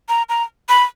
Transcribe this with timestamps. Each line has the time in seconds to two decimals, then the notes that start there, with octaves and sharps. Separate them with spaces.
0.09 A#5
0.29 A#5
0.69 B5